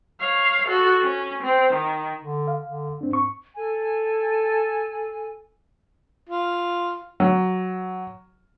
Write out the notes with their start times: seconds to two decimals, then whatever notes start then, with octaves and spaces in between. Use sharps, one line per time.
0.20 C#5 F5
0.68 F#4 A4
1.03 C#4
1.43 C4
1.73 D#3
2.24 D3
2.48 F5
2.66 D3
3.01 G#2 C4 D4
3.13 C#6
3.57 A4 G#5
6.29 F4
7.20 F#3